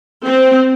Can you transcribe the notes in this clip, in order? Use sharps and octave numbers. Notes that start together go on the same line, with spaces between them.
C4